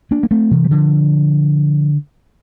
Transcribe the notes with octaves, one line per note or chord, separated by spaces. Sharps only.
A#3 D4
A#3
A3 C4
C3 E3
G3
D3 F3